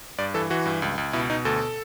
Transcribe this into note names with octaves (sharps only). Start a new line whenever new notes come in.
G2 D5
E3 A4
E3 F#4
G2
C#2
C#2
B2 E4
B2 D#4
D2 A4